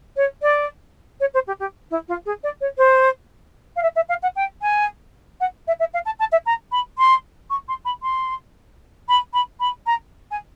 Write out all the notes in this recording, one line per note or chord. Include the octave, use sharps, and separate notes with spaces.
C#5
D5
C#5
C5
G4
G4
E4
F4
G#4
D5
C#5
C5
F5
E5
E5
F5
F#5
G5
G#5
F#5
E5
E5
F5
A5
A5
E5
A#5
B5
C6
C#6
C6
B5
C6
B5
B5
B5
A#5
G#5